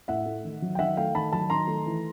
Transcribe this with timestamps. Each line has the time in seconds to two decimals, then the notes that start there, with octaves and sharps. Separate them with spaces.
0.08 A2 E5 F#5
0.26 A3
0.44 D#3
0.62 F#3
0.75 G5
0.79 D#3 E5 F#5
0.97 A3 F5 G5
1.15 D#3 A5 B5
1.32 F#3 A5 B5
1.50 D#3 A#5 C6
1.67 A3
1.86 E3